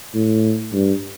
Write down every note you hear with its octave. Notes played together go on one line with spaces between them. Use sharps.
A2
G2